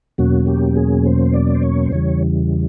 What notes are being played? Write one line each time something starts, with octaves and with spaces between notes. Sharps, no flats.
E2 B2 F#3 A#3 C#4 F#4
G4
G#4
C5
D5
C5
C#5
C5
E2 C#3 E3 G3 C#5